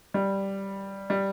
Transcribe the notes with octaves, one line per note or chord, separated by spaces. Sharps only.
G3
G3